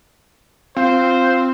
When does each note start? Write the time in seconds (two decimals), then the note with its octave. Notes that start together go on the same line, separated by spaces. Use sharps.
0.76 C4 F4 C5